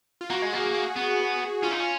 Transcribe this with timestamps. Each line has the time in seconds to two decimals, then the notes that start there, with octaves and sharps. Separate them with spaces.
0.21 F4
0.30 A#3 F#4
0.42 G#3
0.52 A#3 G#4
0.74 G#4
0.96 B3 F#4
1.63 C#4 F4
1.72 D#4
1.80 C#4